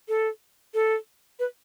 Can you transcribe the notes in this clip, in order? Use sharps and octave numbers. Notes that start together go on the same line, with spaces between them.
A4
A4
B4